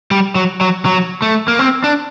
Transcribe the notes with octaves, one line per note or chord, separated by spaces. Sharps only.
G3
F#3
F#3
F#3
A3
A#3
C4
D4